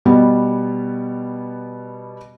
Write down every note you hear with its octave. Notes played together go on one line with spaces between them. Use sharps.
B2 G3 B3